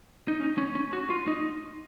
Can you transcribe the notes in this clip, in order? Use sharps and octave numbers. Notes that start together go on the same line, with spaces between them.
D#4
C#4
C#4
C#4
F#4
F4
D#4